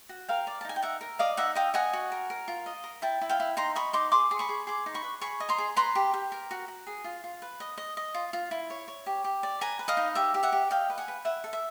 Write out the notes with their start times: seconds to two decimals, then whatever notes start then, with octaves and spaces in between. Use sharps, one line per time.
0.09 F#4
0.28 A#4 F5 G5
0.47 D5
0.61 A5
0.65 D#4 G#5
0.76 G5
0.82 A#4 E5 F#5
1.01 A#4
1.19 D5 D#5 F5
1.37 D#4 E5 F#5
1.55 D#5 F5 G5
1.74 D#5 F#5 G#5
1.93 F#4
2.12 A#4
2.30 A#4
2.48 F4
2.66 D#5
2.84 A#4
3.02 E4 G5 A5
3.21 E4
3.29 F5 G5
3.40 E4
3.57 D#4 A#5 C6
3.75 D#5 B5 C#6
3.93 D#4 C6 D6
4.12 G#4 C6 D6
4.31 G#4
4.39 B5 C#6
4.49 G#4
4.67 G#4 C6 D6
4.86 D#4
4.94 B5 C#6
5.04 B4
5.21 G#4 B5 C#6
5.40 D#5
5.49 A#5 C6
5.58 G#4
5.76 B4 A#5 C6
5.95 G4
6.14 G4
6.32 A#4
6.51 F#4
6.68 F#4
6.87 G#4
7.04 F4
7.24 F4
7.42 B4
7.60 D#5
7.78 D#5
7.97 D#5
8.14 F4
8.33 F4
8.51 E4
8.70 C#5
8.88 C#5
9.06 G4
9.24 G4
9.43 D5
9.61 B4 G#5 A#5
9.79 B4
9.88 D#5 F5
9.97 D#4
10.15 G4 E5
10.34 G4
10.43 E5 F#5
10.52 G4
10.70 D#5 F5 G5
10.90 B4
10.98 F#5 G#5
11.08 B4
11.25 E4 E5 F#5
11.44 A4
11.53 E5